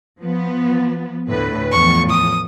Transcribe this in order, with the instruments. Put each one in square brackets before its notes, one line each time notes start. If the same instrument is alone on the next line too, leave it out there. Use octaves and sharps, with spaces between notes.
[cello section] F3 B3
D2 A2 B4
[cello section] E2 A2 F3 [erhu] C#6
[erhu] D#6